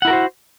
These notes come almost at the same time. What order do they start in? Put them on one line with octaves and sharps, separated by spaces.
F#5 E4 A#4 F#4 C5